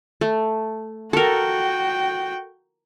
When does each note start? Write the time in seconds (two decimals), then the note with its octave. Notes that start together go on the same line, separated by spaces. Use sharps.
0.21 A3
1.13 F#4 A4 A#4 G5